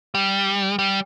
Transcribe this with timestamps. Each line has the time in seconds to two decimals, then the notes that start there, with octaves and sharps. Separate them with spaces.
0.15 G3
0.79 G3